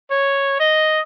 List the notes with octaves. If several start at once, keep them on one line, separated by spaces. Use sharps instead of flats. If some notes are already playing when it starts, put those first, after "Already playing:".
C#5
D#5